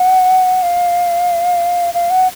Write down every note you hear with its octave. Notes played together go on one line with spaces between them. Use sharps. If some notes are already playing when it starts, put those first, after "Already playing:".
Already playing: F#5
F5
F5
F#5